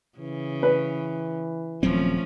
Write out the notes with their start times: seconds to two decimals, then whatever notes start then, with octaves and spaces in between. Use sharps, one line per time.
0.18 C#3 E3
0.63 B4
1.83 D#1 F3 F#3 A3 C4 C#4